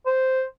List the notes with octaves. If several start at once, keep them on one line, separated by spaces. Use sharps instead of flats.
C5